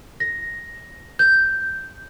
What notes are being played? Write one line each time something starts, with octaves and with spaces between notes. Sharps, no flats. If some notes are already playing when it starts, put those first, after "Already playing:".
A#6
G6